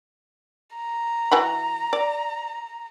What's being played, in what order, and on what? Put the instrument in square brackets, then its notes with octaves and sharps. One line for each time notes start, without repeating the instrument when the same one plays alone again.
[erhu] A#5
[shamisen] E3 F#4 B5
D5